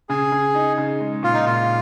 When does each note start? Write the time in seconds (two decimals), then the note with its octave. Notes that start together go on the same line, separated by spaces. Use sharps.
0.09 C#3 G#4
0.32 C#3
0.55 D#4
0.78 C#3
1.01 G#3
1.23 A#2 F4
1.34 D#4
1.46 A#2 F4